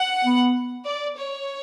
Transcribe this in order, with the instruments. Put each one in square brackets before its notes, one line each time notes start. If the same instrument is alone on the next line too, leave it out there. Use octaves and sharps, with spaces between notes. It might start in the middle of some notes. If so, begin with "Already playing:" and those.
Already playing: [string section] F#5
[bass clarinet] B3
[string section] D5
C#5